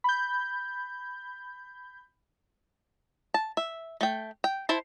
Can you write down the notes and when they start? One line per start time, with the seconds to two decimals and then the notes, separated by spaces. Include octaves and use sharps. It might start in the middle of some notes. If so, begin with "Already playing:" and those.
0.04 B5 G6
3.34 A5
3.57 E5
4.01 A3 G5
4.44 G5
4.69 E4 C5 A5